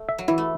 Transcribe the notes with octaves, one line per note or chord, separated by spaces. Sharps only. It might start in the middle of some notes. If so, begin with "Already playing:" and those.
Already playing: A3
E5
F#3
E3 E4
A3